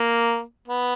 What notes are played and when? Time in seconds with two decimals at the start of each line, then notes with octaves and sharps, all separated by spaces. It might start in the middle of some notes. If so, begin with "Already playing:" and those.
Already playing: A#3
0.68 B3